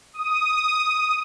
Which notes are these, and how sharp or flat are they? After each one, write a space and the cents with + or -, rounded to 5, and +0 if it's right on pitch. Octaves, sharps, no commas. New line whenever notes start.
D#6 +5